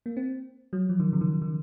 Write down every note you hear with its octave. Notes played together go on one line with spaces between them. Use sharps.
A#3
C4
F#3
F3
D#3
C#3
D#3
D#3